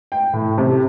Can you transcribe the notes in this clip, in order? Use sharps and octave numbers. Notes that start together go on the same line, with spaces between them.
G5
A2
C3